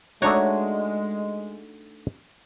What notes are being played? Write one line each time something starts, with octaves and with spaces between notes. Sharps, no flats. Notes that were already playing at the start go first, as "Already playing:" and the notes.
G#3 A3 D4 D#4 F#4 C#5